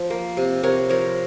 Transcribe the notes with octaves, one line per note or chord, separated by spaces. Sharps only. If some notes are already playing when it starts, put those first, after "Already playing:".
Already playing: F3
A#3
C3
C3 A#4 C#5
F3 A#4 C#5